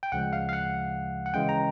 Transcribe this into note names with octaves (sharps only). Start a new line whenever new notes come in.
G5
D2 C#3 F3 G#3 F#5
F5
F5
F#5
F#5
C#3 E3 G#3 C#4 G5
A#5